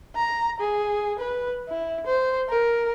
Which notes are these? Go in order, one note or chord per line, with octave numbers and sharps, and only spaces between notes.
A#5
G#4
B4
E4
C5
A#4